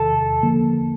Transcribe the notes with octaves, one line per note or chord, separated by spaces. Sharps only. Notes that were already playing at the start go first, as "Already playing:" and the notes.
Already playing: E2 C3 D#3 A4
D3 F3 A#3